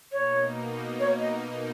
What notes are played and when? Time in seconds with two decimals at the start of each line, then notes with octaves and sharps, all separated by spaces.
0.12 B2 A#3 D#4 C#5
1.00 C#5
1.20 D#5